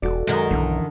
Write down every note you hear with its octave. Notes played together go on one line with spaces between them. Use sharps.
E1 F#4 A4 D5
F#2 D#3 G#3
B1 D3 E3